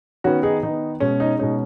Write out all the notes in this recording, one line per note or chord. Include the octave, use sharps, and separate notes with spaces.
D#3 B3 C#4 F#4
D#4 G#4
D#3 B3 D#4
B2 G#3 C#4
D#4
B2 G#3 C#4 D#4